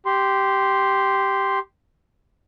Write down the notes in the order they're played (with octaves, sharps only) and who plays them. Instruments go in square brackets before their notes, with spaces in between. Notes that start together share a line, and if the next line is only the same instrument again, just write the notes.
[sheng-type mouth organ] G4 C6